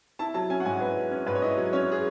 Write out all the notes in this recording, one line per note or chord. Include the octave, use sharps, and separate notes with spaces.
E4 A5
F#3 A5
C#4 G#5
F#5
G#2 G#5
E4 B4
F#3
C#4
G#2 B4
C#5
E4 D#5
F#3
C#4 C#5
G#4